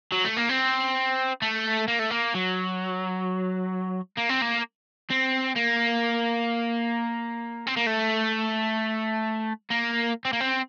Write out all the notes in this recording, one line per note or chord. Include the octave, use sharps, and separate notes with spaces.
F#3
A3
A#3
C4
A3
A#3
A3
A#3
F#3
A#3
C4
A#3
C4
A#3
C4
A#3
A3
A#3
C4
A#3
C4